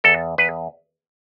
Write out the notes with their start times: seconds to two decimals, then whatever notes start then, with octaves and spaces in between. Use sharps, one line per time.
0.04 E2 A4
0.38 E2 B4